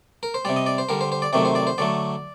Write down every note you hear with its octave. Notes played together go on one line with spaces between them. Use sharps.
A#4
C5
C3 G3 D5
D#5
D5
C5
D3 G3 A#4
C5
C5
D5
C3 D#3 F#3 A3 D5
C5
D5
C5
D3 F#3 A3 D5